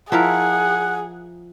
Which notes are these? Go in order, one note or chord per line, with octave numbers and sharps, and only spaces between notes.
F3 E4 G#4 A#4 F#5